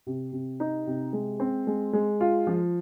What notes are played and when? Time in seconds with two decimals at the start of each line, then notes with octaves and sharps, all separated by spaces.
0.07 C3
0.32 C3
0.60 D#4
0.87 C3
1.13 G#3
1.40 C4
1.67 G#3
1.93 G#3
2.21 F4
2.47 F3